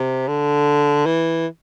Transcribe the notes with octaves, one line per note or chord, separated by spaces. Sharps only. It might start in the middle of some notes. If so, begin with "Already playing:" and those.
Already playing: C3
D3
E3